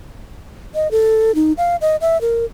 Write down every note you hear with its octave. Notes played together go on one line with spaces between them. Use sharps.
D#5
A4
D#4
F5
D#5
E5
A#4